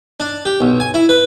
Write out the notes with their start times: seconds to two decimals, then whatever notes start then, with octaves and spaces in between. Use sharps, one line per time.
0.20 D4
0.45 G4
0.60 B1
0.80 G#5
0.94 E4
1.09 B4